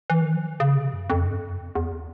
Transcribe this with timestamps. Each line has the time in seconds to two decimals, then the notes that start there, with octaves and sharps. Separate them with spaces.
0.10 E3
0.22 D#3
0.34 F3
0.60 C#3
0.77 C3
0.93 F#2
1.10 F2
1.26 G2
1.43 F#2
1.59 E2
1.75 E2